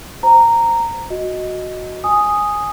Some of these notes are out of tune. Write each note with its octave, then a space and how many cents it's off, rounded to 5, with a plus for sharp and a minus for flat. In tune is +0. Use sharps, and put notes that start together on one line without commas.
C5 -10 A#5 -10
F#4 -5 D#5 +5
G#5 +0 D#6 +0